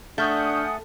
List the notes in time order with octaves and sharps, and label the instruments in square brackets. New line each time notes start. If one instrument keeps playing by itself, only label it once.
[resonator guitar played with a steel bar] A3 [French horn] D4 [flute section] F#5 G#5 D#6 [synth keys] C#6 F6 G6